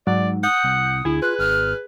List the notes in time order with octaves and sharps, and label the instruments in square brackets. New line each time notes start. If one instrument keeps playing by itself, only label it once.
[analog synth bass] G#2 [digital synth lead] F#3 [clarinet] D5
[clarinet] F#5 [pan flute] D#6 [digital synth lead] G6
[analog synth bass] C2
[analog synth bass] D2 [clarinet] E4 [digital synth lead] G#4
[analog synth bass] F4 [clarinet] B4 [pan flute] F#6
[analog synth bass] G#1 [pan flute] F6